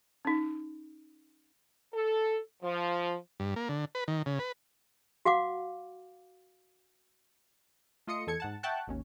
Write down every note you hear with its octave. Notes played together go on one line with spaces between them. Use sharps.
C#4 D#4
A4
F3
G2
A#3
D3
B4
D#3
C#3
B4
F#4 F5 F#5 D6
A3 F4 D#5 C6 D#6 C#7
E2 A4 G#6 C#7
G#2 F#5 A5
E5 F#5 G5 A5 C#6 F#6
G#1 D#2 C#4